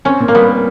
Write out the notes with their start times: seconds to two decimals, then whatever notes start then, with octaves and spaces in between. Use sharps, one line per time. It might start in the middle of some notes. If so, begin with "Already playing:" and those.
0.05 C4 C#4
0.20 A#2
0.28 A#3
0.35 G3 B3